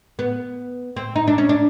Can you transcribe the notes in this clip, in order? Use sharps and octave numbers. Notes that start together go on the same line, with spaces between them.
B3
C4
D#4
D4
C#4
D4